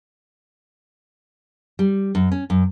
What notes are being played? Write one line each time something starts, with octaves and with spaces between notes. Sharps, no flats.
G3
F#2
C#4
F#2